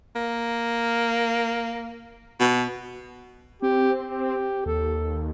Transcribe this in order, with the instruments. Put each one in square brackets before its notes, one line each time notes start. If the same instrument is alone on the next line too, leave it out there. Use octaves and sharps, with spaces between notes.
[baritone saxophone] A#3
B2
[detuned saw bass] C4 [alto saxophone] G4
[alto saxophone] G4
[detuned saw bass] D#2 [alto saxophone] A4